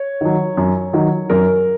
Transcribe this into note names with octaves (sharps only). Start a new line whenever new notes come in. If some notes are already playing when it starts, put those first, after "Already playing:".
Already playing: C#5
D#3 F#3
F#2
D#3 F#3
F#2 A#4